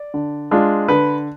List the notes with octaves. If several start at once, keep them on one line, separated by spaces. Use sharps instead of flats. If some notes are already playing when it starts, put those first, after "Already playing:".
Already playing: D5
D3
G#3 D4 F4
D3 B4